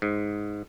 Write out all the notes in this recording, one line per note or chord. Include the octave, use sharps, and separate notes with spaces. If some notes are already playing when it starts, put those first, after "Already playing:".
G#2